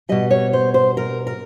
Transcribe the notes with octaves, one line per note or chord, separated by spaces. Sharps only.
B2 G3 D#5
C#5
C5
C5
A#4
A#4